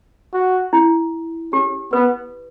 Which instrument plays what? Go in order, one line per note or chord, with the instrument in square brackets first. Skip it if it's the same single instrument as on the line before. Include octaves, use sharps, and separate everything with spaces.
[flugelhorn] F#4
[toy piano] E4
[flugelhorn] C#4 [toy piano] G4
[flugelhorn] B3 [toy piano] B4